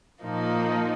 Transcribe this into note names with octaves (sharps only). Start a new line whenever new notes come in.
A#2 F3 A#3 D#4